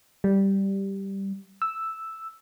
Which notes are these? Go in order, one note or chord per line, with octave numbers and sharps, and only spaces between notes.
G3
E6